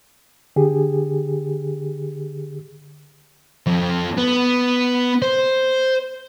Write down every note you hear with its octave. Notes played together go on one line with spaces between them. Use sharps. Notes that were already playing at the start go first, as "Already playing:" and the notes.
D3 G4 G#4
F2
B3
C5